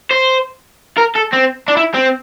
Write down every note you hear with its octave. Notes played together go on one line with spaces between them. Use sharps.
C5
A#4
A4
C4
D4
E4
C4